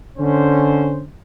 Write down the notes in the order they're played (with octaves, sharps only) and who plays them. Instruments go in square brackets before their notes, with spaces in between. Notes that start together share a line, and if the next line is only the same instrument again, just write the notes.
[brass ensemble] D3 C#4 C5